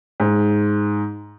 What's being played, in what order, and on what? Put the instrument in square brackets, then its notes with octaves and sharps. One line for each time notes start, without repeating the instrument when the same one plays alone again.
[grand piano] G#2